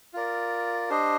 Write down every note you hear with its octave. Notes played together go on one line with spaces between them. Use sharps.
F4 A#4 D5
D4 G4 C5 D#5